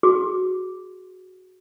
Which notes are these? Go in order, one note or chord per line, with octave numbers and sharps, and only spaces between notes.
F#4 G#4 D6